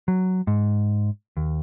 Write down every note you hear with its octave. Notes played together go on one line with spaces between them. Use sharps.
F#3
G#2
D#2